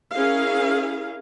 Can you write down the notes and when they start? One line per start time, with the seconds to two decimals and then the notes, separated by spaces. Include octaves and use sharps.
0.13 C#4 E4 G#4 A#4 F5